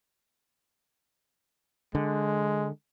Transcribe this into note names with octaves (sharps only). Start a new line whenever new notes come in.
D3 G#3